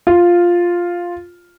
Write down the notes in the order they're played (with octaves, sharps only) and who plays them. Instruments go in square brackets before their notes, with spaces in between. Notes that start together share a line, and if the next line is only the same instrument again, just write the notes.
[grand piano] F4